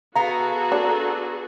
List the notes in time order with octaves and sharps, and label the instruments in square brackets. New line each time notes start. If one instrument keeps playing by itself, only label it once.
[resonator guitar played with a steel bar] B3 F5 [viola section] F#4 G#4 A4 [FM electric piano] A#5
[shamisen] D4